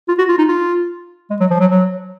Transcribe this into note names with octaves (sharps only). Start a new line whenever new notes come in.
F4
F#4
F4
D#4
F4
G#3
F#3
F3
F#3
F#3